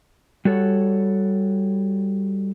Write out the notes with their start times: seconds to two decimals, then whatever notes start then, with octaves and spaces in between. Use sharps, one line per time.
0.45 G3 F#4 A4 C#5 F#5